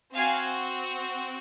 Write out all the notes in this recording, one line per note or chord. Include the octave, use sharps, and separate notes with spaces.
C4 F#4 F5 G#5